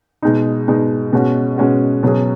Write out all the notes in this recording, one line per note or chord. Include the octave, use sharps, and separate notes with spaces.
B2 G#3 D#4
B2 G#3 D#4
B2 G#3 C#4 F#4
B2 G#3 C#4 F#4
B2 F#3 C#4 G#4